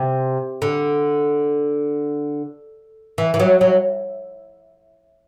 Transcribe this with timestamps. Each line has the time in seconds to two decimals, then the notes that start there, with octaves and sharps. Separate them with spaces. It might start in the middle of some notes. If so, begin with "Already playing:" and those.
Already playing: C3
0.62 D3
3.18 E3
3.34 E3
3.40 F#3
3.61 F#3